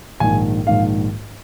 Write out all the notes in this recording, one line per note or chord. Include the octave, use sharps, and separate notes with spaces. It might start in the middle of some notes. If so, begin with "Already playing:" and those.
A#1 G#2 D#3 G#5
A#1 G#2 D#3 F5